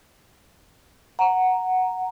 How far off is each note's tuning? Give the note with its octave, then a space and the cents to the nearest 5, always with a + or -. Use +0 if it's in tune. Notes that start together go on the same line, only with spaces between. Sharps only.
F#5 +0 A#5 +0